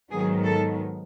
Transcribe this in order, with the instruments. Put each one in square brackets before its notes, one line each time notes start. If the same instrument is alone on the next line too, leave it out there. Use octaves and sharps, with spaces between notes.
[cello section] G#2 D#3 F#3 B3 G#4
A4